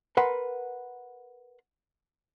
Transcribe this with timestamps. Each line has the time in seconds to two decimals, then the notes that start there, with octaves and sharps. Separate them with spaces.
0.17 A#4 B4 F#5 C6